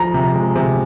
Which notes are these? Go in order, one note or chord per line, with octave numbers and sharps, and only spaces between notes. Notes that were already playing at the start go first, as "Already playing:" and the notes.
Already playing: F3 A#5
C3
G#3
C3